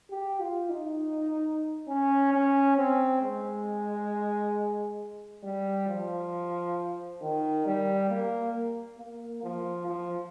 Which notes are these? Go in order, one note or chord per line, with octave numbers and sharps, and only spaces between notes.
G4
F4
D#4
C#4
C#4
C4
G#3
G3
F3
D#3
G3
A#3
A#3
F3
F3